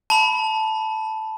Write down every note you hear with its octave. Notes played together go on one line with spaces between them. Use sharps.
A5 B5